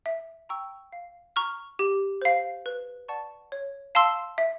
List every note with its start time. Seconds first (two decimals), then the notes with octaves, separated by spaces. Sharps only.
0.06 E5
0.49 G5 A#5 C#6 E6
0.93 F5
1.36 A#5 C#6 F6
1.79 G4
2.22 C5 F5
2.66 B4
3.09 D5 F#5 A5 C#6
3.52 C#5
3.95 F5 A5 C6 E6
4.38 E5